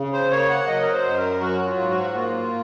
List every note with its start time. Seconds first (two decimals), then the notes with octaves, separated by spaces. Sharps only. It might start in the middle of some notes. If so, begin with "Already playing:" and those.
Already playing: C#3
0.13 C5
0.31 A#3 C#5
0.49 F#5
0.67 F#3 D#5
0.82 A#4
0.92 C5
1.05 F#2
1.17 A#4
1.41 F#3 F#4
1.66 F4
1.78 G#2
1.90 F#4
2.15 A#3 F4